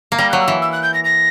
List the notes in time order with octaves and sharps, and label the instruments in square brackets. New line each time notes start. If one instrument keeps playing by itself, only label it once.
[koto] A#3
[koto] G3 [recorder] A#6
[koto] F#3 [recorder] F#6
[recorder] E6
[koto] E3
[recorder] E6
F#6
G6
A#6
A#6